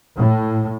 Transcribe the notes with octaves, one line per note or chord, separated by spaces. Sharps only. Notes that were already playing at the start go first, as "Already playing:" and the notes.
A2